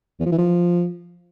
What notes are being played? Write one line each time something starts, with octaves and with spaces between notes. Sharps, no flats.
E2
F3
E3
F3